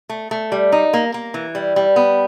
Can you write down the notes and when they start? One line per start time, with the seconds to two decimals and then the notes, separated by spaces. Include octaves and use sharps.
0.09 A3
0.31 A3
0.52 G3
0.72 D#4
0.93 A#3
1.14 A#3
1.34 E3
1.55 G3
1.76 G3
1.96 B3